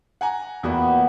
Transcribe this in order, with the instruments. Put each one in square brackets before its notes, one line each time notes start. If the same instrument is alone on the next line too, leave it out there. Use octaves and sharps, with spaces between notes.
[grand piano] F#5 G#5 A#5
[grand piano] E2 F#4 [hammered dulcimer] A#2 B3 G4